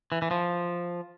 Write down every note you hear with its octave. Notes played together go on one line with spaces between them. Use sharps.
E3
E3
F3